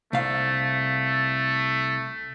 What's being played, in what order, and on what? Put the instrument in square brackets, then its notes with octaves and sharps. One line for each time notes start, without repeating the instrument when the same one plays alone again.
[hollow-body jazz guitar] C2 F5 [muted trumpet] A3